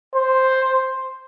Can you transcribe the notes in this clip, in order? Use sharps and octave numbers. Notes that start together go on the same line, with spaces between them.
C5